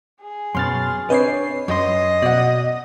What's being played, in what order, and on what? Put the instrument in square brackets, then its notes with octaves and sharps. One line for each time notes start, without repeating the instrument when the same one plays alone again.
[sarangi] G#4
[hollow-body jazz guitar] F#2 B2 [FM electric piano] C6 F6 A6
[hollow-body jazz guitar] C4 D4 D#5 [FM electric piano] B4 C#5 C7
[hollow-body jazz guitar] F#2 A4 C6 [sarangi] D#5
[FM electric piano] B2 [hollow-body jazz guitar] D5 E5 F#5